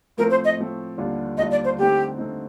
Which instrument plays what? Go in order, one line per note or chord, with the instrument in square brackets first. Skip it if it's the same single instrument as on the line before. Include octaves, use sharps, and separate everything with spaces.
[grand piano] A2 F3 A3 C4 [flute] A#4
[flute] C5
D#5
[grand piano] A2 F3 A3 C4
D#2 D3 G3 D4 F4
[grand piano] D#2 D3 G3 D4 F4 [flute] D#5
[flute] D5
C5
[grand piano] D3 A3 C4 D#4 [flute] G4
[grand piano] D3 A3 C4 D#4